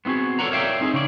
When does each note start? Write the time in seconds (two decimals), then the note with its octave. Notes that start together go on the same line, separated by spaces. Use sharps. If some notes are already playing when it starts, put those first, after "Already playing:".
0.05 B3 C4 D#4 F#4 G#4
0.39 A4 C#5 D5 F#5 A#5
0.51 A#4 C#5 D5 E5 F5 G5
0.81 C4 D#4 G#4
0.93 C#3 C#4 D5